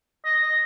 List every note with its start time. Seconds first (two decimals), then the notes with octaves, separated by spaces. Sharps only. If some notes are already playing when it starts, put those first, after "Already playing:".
0.25 D#5
0.42 D#5